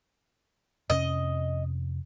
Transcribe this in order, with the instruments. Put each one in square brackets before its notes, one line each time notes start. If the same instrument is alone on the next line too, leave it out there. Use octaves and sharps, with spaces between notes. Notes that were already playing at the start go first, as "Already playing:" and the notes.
[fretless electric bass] F2 C3 C#4 [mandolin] D#5